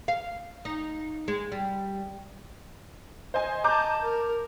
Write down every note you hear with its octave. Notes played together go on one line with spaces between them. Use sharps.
F5
D#4
G#3
G3
C5 D#5 G#5
D#5 A5 A#5 D6 G6
A#4